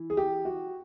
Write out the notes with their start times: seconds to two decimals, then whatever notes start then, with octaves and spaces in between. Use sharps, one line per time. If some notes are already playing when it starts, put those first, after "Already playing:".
Already playing: E3
0.10 G#4
0.17 G4
0.45 F#4